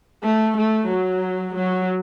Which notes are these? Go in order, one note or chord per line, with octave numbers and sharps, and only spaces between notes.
A3
A3
F#3
F#3